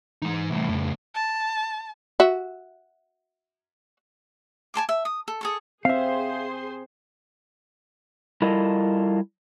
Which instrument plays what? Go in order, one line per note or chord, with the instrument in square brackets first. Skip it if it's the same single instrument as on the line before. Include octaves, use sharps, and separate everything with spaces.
[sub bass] E3 [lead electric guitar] G#3 D#4
[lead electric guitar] C2 A2
[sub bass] F2 [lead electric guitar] A2 C#3
[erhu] A5
[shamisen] F#4 E5
[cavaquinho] G#5 A5 C6 D6
E5
D#6
A4
G#4 A4 C#6
[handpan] C4 [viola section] G#4 C5 C6 [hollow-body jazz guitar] E5 F5
[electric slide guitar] G3 E4 F4 A4 A#4 D#5